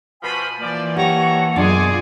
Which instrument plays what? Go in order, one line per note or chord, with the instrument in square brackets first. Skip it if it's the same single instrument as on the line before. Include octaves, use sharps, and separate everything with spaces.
[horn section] B2 F3 B5 [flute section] G#5
[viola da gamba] E3 A#3 [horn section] F3 D5
[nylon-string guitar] G4 [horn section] C#5 A#5 [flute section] F#5 A5 C#6
[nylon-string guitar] F#2 B2 D4 [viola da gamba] F4 G#4 [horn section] D5 G#5